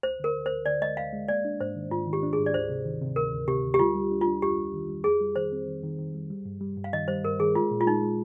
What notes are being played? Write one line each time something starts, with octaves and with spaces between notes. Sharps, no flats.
D2 C5
D3 A#4
D2
C5
D2
D3 D5
G#3 D#5
D2 F5
G#3
A#3 D5
D4
G#2 C5
D#3
G#2 F4
D#3
G4
D4
G#4
G#2
D5
D2 C5
C3
D#3
C3
D2 A#4
D2
C3 G4
D2
G4
G3 F4
G3
D4
F4
D4
F2 G4
G3
D#3
G3
F2 G#4
G3
D#3 C5
C4
D#3
D#3
D#3
G3
G3
G2
G3
G2
F5
D#3 D#5
G3 C5
G2 A#4
D#3 G#4
G#3 F4
A#2
F4
G#3 D#4
G#3